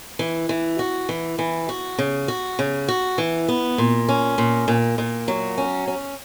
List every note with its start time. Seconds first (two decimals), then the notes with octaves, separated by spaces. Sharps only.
0.19 E3
0.49 E3
0.79 F#4
1.09 E3
1.39 E3
1.69 F#4
1.98 C#3
2.28 F#4
2.59 C#3
2.88 F#4
3.18 E3
3.48 B3
3.78 A#2
4.09 C#4
4.38 A#2
4.68 A#2
4.98 A#2
5.28 F#3
5.58 C#4
5.87 C#4